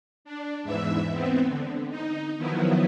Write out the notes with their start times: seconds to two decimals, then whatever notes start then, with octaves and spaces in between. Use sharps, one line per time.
0.25 D4
0.63 E2 G#2 E3 E5
1.11 B3 C4
1.48 D3
1.89 D#4
2.38 D#3 F3 F#3 B3 E4